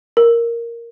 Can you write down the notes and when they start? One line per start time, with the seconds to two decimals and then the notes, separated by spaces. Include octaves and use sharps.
0.17 A#4